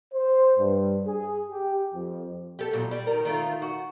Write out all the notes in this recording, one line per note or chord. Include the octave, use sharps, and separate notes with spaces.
C5
G2
G#4
G4
F2
G4 A4
E2 A#2 F#3
G3
D#3 A#4
D#3 A3 F4
F#4